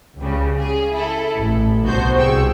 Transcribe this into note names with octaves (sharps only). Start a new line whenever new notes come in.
C#2 C#3 G3
G#4
E4 A4
A1
C2 B3 D4 F#4 C5 G6
C2 G#4 G5 C#6 E6